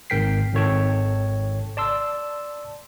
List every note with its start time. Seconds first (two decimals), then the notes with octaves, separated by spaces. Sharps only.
0.10 G#1 G#2 A#4 G5 B6 C7
0.54 G#1 D#3 A4 C#5 G5 A5
1.77 D5 A5 C6 E6